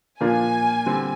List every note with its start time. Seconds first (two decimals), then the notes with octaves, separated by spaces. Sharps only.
0.20 A#2 F3 A#3 D4 F4 G#5
0.86 D3 G3 C4